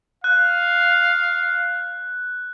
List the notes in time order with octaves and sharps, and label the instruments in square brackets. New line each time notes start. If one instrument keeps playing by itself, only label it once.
[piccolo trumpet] F5 [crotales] F#6